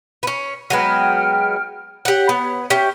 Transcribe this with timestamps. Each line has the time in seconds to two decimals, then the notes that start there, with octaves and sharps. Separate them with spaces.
0.23 B3 C#4
0.70 F#3 G#3 B3 G5 F6
2.05 G4 C#5 F#5
2.29 B3
2.70 C#4 G4 E5